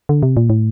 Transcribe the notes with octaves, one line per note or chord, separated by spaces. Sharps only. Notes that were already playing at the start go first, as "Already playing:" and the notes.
D3
C3
A#2
A2